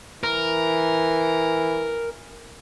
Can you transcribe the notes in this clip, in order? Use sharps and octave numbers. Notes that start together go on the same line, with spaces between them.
E3 A#4